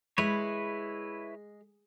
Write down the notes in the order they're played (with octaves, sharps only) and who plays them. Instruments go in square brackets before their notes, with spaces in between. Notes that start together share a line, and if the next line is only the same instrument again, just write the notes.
[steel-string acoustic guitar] G#3 [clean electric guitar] E4 B4 C#5